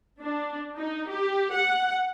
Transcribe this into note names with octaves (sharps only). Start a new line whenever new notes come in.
D4
D#4
G4
F#5